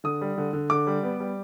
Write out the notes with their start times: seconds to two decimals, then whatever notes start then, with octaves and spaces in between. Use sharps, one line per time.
0.04 D3 D#6
0.21 G3
0.38 D3
0.53 D3
0.70 D3 D6
0.87 G3
1.03 B3
1.20 G3